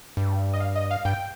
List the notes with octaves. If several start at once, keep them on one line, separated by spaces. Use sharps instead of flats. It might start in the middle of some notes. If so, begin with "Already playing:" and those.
G2
D#5
F5
D#5
F5
G2 G5